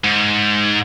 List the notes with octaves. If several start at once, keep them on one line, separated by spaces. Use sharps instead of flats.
G#2